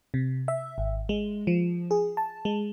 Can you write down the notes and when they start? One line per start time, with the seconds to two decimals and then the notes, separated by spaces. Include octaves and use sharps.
0.14 C3
0.48 E5
0.78 G#1
1.09 G#3
1.47 F3
1.91 G#4
2.17 A5
2.45 G#3